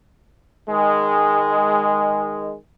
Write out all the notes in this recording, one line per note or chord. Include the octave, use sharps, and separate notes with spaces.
D#3 G#3